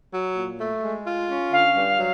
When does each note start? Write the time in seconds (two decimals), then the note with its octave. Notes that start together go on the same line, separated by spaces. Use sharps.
0.12 F#3
0.36 A#2
0.59 A3
0.82 G#3
1.06 F4
1.29 C#4
1.52 D3 F5
1.76 G2
1.99 F#3